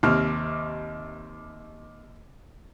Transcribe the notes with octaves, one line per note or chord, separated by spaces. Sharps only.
D#2 C3 F6